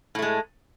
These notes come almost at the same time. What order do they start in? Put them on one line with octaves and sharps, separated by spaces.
A2 A3 G#3